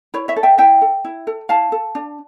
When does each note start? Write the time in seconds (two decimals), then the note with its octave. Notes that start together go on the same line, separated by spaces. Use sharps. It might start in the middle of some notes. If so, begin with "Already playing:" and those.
0.14 E4 C#5
0.28 C#5 E5
0.36 A4
0.43 E5 G5
0.58 E4 E5 G5
0.82 A4
1.05 E4
1.27 A4
1.49 E4 F5 A5
1.72 A4
1.95 D4